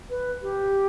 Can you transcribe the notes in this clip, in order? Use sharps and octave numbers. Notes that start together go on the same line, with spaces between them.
B4
G4